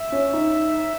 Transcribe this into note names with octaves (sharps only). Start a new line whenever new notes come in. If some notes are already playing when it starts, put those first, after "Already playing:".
Already playing: E5
C#4
D#4